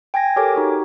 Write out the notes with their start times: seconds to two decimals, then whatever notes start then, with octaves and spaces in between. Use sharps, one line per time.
0.14 G5 G#5 G#6 A#6
0.36 G4 A4 A#4 C#5 G#5 D6
0.55 D#4 F#4 G4